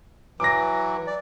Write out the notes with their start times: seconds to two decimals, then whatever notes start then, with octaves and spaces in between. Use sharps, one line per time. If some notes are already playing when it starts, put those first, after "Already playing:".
0.40 E3 F#3 D6 A#6
1.07 D5